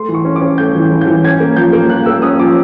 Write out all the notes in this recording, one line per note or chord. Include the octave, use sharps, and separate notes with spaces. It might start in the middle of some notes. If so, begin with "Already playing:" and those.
Already playing: A3 C6
E3
C#6
C#4
D6
C#4
A3 G6
E3
E3
G6
E3
C#4 G#6
A#3
F3 G6
A#3
F3 F#6
A#3 E6
C#4 D#6
F3 D6